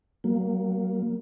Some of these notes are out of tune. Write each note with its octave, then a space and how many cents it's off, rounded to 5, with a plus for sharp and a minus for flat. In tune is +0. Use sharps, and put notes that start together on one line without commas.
F#3 +40 A#3 +0